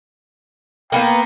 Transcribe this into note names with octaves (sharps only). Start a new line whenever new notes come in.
A#3 B3 G5